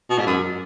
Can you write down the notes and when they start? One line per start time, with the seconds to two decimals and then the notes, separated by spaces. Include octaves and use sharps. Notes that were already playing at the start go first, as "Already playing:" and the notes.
0.10 B2
0.18 G#2
0.27 F#2